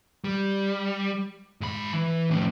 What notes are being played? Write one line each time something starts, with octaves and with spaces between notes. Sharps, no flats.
G3
G#2 B5
E3
F2 A2